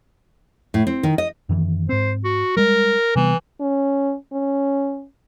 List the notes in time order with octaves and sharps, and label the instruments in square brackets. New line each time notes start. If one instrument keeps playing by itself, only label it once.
[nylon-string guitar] A2
C4
D#3
D#5
[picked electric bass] F#2 D#3 E3
[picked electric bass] G#2 C4 [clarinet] C5
[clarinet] F#4
[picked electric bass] G3 G#3 [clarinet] A#4
[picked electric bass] C3 G3 B3 [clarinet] E3
[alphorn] C#4
C#4